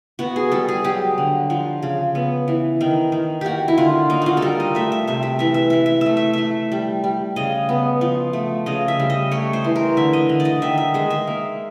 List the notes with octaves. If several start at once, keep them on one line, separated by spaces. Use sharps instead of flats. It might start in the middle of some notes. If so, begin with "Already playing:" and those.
B3 F#4
G#4
G3 A4
G#4
F#3 G4
D3
F3
C#3
B3
E3
D#3
D#3
A#3 F#4 G4
E4
D3 F4
A#3 D#4
F4 F#4
A4
G3 A#4
D#5
A3 E5
E5
C3 E5
E5
E3 E5
E5
E3 E5
E5
A3 E5
E5
A3 E5
G3
G3
C#3 D#5
B3
F3
A3
C#3 D#5
E5
G3
D#5
A3 C#5
C5
E3
A#4
D3 E5
D#5
D3
D5
D#5
D#3 E5
E5
G#3 D#5
E5
A#3